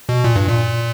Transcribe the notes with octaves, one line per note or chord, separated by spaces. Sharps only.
B2
A#2
G2
A#2